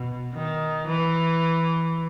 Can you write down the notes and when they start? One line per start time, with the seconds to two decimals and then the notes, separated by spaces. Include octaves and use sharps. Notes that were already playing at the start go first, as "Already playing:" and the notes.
Already playing: B2
0.34 D#3
0.87 E3